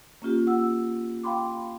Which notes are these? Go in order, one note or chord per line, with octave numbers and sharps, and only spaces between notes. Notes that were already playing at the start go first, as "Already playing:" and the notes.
A#3 C#4 F4 G4
F#5 E6
F5 G5 B5 C6 D6